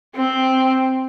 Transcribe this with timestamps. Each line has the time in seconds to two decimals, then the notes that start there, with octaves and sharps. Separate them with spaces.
0.16 C4